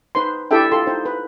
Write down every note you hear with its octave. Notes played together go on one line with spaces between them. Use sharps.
D#4 B4 C5 C6
D4 E4 G4 A4 E5 G5
F4 A4 C6
D#4 C5
B4